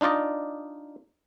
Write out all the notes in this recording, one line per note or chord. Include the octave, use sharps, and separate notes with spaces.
D4 D#4 F4 D5 D#5